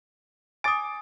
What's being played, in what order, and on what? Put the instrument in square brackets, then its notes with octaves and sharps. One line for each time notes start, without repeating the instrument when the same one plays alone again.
[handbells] G#5 D#6 [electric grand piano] D6 A6 D7